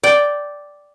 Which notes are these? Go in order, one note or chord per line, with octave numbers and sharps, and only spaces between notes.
D5 G5